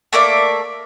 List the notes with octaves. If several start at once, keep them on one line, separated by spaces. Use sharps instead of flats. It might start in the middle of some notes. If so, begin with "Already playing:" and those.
A3 A#3 D5 E5